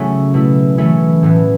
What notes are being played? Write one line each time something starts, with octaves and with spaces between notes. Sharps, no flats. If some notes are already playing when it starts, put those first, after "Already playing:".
Already playing: C#3 F#3 A3 C#4 E4
B2 A3 E4
E3 A3 C#4 E4
A2 E3 B3